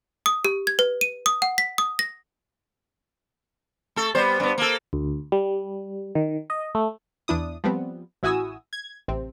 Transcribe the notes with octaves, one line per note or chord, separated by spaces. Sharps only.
D#6
G4
G#6
B4
D#7
D#6
F#5
B6
D#6
A#6
A3 A4
G3 B3 C5
G2 B3
A#3 A4
D2
G3
D#3
D#5
A3
E2 D4 E4 D#6
F3 G3 B3 C4
A1 E4 F#4 G#5 D#6 E6
G#6
A1 C3 C4